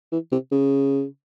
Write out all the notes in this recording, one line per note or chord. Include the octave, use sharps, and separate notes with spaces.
E3
C3
C#3